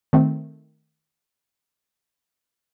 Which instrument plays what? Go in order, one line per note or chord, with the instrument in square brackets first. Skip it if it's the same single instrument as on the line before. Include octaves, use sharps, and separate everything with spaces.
[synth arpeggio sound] D#3 A3 C4